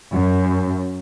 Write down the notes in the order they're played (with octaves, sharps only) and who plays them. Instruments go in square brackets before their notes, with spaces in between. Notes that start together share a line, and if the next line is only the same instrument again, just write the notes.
[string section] F#2